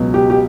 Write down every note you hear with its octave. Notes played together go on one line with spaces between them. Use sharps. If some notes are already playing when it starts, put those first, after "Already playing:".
Already playing: C#2 B2 F#3
G4
G4